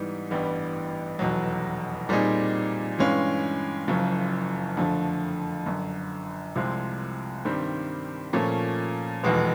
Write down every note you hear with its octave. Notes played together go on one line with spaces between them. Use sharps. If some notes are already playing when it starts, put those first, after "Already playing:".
Already playing: G#2 E3 G3 B3 D#4
A1 G2 E3 G3 B3
F1 E2 B2 F#3
A#2 G3 C4 D#4 G#4
G2 E3 G#3 C#4 F4
F#1 F#2 C#3 F3
F2 D3 F3 A3
G1 F#2 D3
C2 C3 F3 G#3 C4
G2 D#3 G3 C4
A#2 F3 A3 C#4
F1 E2 B2 G#3 B3